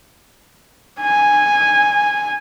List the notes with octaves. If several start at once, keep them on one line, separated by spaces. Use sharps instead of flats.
G#5